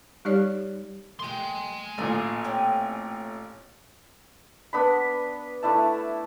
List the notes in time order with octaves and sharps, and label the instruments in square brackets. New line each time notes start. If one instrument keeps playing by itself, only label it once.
[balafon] G3 D#4 G4 C#5 D5
[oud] A#3 G4 [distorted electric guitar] G#5 C6
[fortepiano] A1 A#2 [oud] F#3 A3
[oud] C4 C#4 G4
[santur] B3 D4 B5
A3 D4 E4 A5